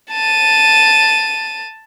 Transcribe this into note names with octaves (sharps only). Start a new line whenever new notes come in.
A5 D#7